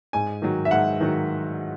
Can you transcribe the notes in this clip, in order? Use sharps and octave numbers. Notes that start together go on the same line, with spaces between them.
G#2 G#5
D#3 F#3
E5
G#2 F#5
D#3 F#3